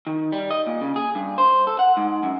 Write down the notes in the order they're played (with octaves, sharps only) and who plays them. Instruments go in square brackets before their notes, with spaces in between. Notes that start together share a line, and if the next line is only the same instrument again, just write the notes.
[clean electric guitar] D#3
G3
D#5
A#2
C#3
G#4
G2
C5
A4
F#5
G#2
F#2